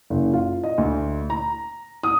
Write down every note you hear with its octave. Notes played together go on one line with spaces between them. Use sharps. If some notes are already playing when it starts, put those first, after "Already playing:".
F#1
F4
D#5
D2
A#5
D#6